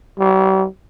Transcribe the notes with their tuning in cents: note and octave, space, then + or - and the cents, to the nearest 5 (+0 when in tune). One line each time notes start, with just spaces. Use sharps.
G3 -45